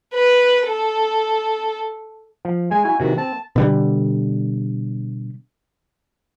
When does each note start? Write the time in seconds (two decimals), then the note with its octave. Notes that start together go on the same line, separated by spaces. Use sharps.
0.14 B4
0.68 A4
2.45 F3
2.71 G#3 G#5
2.85 E4 F#4 G#5
3.00 C3 D#3 E3 F#4
3.18 C4 A5
3.56 B2 D3 G3